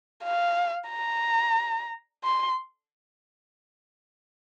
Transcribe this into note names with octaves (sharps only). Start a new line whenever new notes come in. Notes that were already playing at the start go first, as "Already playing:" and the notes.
F5
A#5
C6